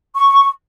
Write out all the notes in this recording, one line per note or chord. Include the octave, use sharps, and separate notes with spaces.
C#6